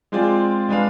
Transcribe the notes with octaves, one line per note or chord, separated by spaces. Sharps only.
G#3 C4 F4 G#4 D5
G#3 D4 G#4 B4 F5